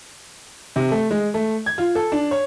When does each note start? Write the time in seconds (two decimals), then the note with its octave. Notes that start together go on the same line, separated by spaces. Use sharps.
0.76 C3
0.91 A3
1.11 G#3
1.34 A3
1.66 G#6
1.78 F4
1.95 A4
2.12 D4
2.31 C#5